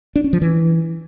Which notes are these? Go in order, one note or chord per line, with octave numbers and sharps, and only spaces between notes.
D4
C#4
F3
E3